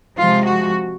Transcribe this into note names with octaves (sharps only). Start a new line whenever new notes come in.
C3 F3 G#3 F4
F#4